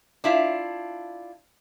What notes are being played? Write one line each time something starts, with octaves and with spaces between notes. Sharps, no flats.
D4 E4 F4